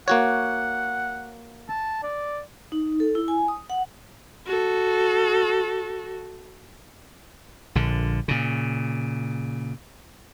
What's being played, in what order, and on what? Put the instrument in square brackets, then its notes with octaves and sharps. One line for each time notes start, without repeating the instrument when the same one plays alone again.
[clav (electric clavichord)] A#3 F#4 C#5 [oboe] F#5
[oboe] A5
D5
[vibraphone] D#4
A4
E4
G#5
D#6
F#5
[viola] F#4 A4
[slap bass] A#1 D3
A#2 C#3